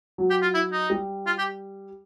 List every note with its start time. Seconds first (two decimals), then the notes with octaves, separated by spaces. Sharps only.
0.18 F#3
0.30 G4
0.42 F4
0.54 E4
0.72 D#4
0.90 G3
1.26 F4
1.38 G4